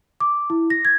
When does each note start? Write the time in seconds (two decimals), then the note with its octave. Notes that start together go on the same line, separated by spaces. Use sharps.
0.20 D6
0.50 E4
0.70 A#6
0.85 G#6